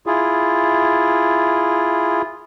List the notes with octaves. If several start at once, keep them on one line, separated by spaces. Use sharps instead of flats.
E4 F4 G#4